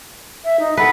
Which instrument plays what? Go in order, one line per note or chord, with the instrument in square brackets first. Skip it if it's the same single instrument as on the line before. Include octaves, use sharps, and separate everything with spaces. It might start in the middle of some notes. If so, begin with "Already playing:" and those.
[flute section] E5
D#4
[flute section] A4 F#5 [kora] B4